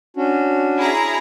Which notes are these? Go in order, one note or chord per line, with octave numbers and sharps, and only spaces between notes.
C#4 D4 F#4
E4 G#4 A#5